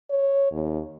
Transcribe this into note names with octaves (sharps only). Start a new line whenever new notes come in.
C#5
D#2